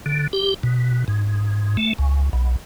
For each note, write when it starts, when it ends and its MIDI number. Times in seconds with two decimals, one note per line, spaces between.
0.06 0.27 50
0.33 0.54 67
0.63 1.04 47
1.08 1.77 44
1.77 1.93 57
1.99 2.29 37
2.33 2.56 35